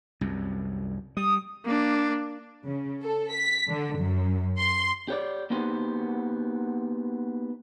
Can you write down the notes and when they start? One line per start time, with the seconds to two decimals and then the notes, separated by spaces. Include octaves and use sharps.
0.21 C2 F#2
1.17 G3 D#6
1.65 A#3 D4
2.65 C#3
3.02 A4
3.31 B6
3.69 D3
3.98 F#2
4.59 C6
5.08 G4 C#5 D5
5.50 A#3 B3 D#4 F#4 G4 C5